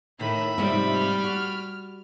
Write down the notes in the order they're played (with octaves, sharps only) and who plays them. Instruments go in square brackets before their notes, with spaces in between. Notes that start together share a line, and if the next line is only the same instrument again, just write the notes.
[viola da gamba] A2 D#3 [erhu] E5 [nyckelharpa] B5
[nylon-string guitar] G#2 C3 F3 [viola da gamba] G3
[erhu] F6
[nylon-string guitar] F#4